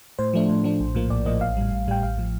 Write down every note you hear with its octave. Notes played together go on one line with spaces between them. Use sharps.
A2 C5
F3 A3 D4
A2
F3 A3 D4
A#1
A2 F3 A#3
A#1 D5
A2 F3 A#3 D#5
A1 F5
A2 G3
A1
A2 G3 G5
A1 F5
A2 F3